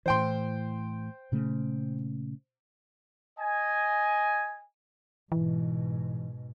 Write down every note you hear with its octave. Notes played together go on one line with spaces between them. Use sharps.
A2 E3 C5 G5 C6
A#2 C#3 A3
D#5 G#5
G#2 B2 E3